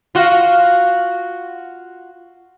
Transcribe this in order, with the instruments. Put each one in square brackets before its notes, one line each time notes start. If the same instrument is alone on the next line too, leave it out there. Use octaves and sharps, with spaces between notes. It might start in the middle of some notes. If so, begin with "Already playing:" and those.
[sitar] F4 F#4